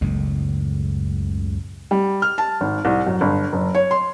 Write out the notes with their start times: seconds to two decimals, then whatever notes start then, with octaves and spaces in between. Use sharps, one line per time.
0.01 F#1 C#2 A2
1.91 G3
2.22 F6
2.38 A5
2.61 G#1
2.85 C2
3.07 F#2
3.21 G1
3.53 F#1
3.75 C#5
3.91 C6